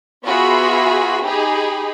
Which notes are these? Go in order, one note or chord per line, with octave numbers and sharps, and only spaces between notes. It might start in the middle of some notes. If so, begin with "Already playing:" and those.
B3 F4 F#4 G#4 E5 B5
D#4 G4 G#4 B5